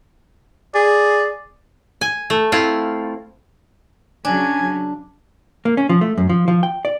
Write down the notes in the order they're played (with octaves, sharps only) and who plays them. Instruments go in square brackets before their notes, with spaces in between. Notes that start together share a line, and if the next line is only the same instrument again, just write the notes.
[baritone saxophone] G#4 [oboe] D5
[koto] G#5
A3
C4 E4 F4
[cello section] C#3 F#3 C#4 [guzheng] D4 [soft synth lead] G#5
[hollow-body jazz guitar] A#3
C#4
F3
A3
F#2
F3
F3
G5
D5